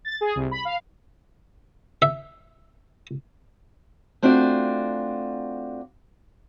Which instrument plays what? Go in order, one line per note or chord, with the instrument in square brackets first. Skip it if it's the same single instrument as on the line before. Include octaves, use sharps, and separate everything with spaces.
[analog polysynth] A6
G#4
C2
B5
F5
[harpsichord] E5
[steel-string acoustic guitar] A3 C4 D4 F4 F#4 D5